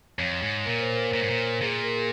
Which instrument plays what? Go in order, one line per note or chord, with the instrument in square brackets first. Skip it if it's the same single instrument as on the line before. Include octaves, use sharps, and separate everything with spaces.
[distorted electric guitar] F2 [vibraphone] C#5
[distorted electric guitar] G#2
[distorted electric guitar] A#2 [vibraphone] A#4
[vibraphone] C5
A#4
[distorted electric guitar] A#2 [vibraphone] A#4
[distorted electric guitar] G#2
A#2
[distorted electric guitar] A#2 [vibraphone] G#4
[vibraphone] A#4
G#4